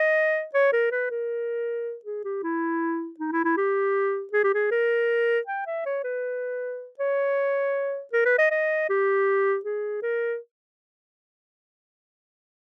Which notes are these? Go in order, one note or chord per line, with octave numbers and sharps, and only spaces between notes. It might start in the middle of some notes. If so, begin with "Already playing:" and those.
Already playing: D#5
C#5
A#4
B4
A#4
G#4
G4
E4
D#4
E4
E4
G4
G#4
G4
G#4
A#4
G5
E5
C#5
B4
C#5
A#4
B4
D#5
D#5
G4
G#4
A#4